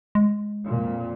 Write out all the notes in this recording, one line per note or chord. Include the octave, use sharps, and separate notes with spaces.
G#3
F2 A#2